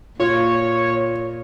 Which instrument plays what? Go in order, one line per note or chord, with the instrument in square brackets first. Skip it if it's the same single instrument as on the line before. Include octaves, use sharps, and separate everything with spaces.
[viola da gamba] A#2 [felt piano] F4 [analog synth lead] C#5